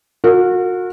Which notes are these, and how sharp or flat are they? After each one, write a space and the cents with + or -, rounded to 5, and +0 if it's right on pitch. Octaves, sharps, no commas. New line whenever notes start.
F#4 -35 A#4 -40